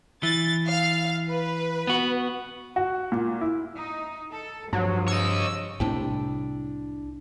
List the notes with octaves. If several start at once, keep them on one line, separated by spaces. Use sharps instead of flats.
E3 A6
F5
B4
B3 F#4
F#4
A#2
E4
D#4
A4
G2 F3 F#3
C#5 D#5 E6
C2 A2 C3 D4 E4 G5